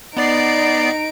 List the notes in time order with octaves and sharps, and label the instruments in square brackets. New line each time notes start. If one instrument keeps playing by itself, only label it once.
[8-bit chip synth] B3 D5 C7 [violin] D#4 D7